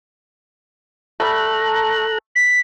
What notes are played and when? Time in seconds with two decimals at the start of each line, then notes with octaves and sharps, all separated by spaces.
1.20 G3 A3 A4 A#5 F#6
2.36 B6